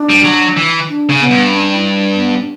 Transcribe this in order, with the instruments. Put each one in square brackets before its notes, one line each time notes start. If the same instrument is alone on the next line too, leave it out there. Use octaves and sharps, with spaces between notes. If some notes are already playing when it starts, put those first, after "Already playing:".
Already playing: [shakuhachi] D4
[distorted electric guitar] G3
F#3
E3
[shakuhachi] D4
[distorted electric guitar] C#3
[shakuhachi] B3
[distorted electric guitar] G2
[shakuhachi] C#4
E4
B3
D4